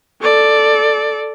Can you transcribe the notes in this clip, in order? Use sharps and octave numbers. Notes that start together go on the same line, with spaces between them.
A4 D5